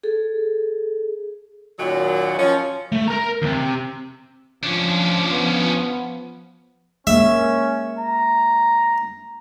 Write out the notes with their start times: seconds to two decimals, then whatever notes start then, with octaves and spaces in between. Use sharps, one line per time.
0.03 G#4 A4
1.79 F#2 A#2 D#3 F#3
2.39 F3 C#4
2.92 A3
3.08 A#4 A#5
3.42 D#2 C3
4.63 F3 C#4 D4
5.32 B3
7.07 G#3 A#3 C#4 E5
7.99 A#5